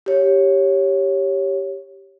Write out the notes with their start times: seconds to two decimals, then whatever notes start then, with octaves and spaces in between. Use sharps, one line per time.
0.06 G4 C#5